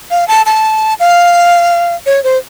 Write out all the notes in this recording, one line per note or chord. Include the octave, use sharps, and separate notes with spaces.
F5
A5
A5
F5
C#5
C5